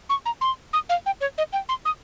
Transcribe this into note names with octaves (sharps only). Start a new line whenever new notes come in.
C#6
A#5
C6
D#6
F5
G5
C#5
D#5
G5
C6
D#6